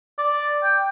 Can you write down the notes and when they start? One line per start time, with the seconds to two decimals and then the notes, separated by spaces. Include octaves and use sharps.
0.18 D5
0.63 G5